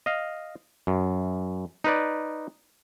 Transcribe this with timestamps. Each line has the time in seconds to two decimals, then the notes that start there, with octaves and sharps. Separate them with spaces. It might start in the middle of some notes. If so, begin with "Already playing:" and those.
0.06 D#5 F5
0.87 F#2
1.84 D#4 B4 D5